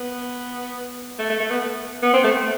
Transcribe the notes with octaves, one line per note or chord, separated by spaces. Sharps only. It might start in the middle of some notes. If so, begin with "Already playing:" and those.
Already playing: B3
A3
A3
A3
B3
B3
C4
A3